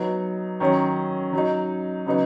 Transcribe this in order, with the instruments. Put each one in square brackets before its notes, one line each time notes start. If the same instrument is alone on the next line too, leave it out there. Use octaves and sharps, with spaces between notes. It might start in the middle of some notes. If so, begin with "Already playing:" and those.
Already playing: [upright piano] F#3 B3 D#4
D#3 F#3 C#4
F#3 D#4
C#3 F#3 B3 D#4